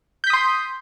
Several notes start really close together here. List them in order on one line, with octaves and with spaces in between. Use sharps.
G6 B6 D#6 C6